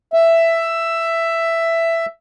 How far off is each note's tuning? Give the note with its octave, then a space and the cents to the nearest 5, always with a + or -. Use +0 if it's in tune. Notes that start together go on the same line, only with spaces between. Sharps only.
E5 +10